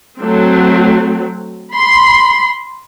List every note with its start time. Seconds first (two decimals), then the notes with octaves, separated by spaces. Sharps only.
0.18 F#3 A3 C4
1.71 B5 C6